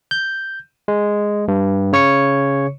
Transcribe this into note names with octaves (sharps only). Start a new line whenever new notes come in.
G6
G#3
G2
C#3 C#5 C#6 C#7